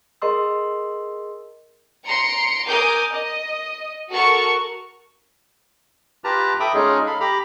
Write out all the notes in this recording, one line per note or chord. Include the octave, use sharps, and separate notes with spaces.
G#4 A#4 D#5 C6 E6
A#5 C6 C#7 D7
A#4 G#5 D6 D#6 G6
D#5
F#4 A4 A#4 C#6
F4 G4 B4 A5 A#5
A4 E5 G5 B5 D6 D#6
G#3 C#4 D#4 F4 G#4
A4 F5 B5
G4 A#5 B5